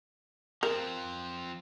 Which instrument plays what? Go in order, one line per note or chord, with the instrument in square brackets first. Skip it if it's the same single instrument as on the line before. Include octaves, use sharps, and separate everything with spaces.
[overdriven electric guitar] F3 C4 [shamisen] A#4